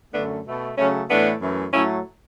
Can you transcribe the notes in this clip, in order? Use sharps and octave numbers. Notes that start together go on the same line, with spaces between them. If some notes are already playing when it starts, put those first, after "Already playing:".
F#2 D3 A3 B3 D4
B2 A3
C#3 F#3 A3 C#4
A2 E3 A3 B3 D4
F#2 E3 A3
A2 F#3 A3 C#4 E4